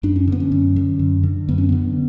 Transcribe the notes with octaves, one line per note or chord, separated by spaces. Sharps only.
F#2 D4
C#4
D3 B3
C#4
F#2
D3
F#2
D3
F#2 B3
C#4
D3 B3